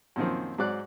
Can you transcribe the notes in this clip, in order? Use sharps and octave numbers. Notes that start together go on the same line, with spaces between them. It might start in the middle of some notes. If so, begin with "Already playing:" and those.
F#2 A#2 D#3 F3 C4
G#2 F#3 C5 D5 F#6